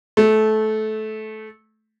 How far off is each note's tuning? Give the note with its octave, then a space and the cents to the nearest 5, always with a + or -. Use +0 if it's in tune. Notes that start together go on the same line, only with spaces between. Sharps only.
A3 -20